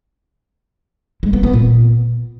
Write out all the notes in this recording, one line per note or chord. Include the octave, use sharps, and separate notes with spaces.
G#3
B3
B3
A#2